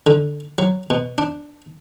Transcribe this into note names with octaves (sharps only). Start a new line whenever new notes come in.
D3
F#3
B2
D4